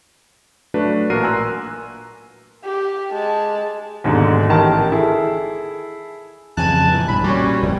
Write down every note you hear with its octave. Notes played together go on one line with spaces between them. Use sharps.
F#3 A3 D4 F#4 B4
A1 A#2 F#4 A#4 C7 D#7
G#5 A#5 C6 E6 F#6
G4
G#3 A5
D#2 G#2 B2 D3
A1 D#3 G4 A#4 A5
E4 G#4 A4
F2 C#3 E3 G#5 A5 F#6
A#2 E3
B1 G2 B5
A#2 G3 C#4 F#4
F1 E2 B2